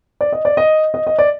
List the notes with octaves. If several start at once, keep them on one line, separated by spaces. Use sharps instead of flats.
D5
D#5
D5
D#5
D#5
D#5
D5